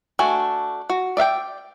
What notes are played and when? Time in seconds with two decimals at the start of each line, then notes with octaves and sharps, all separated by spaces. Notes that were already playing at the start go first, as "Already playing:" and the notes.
0.19 A3 D4 F#4 G#5
0.90 F#4
1.17 D5 E5 F5 G5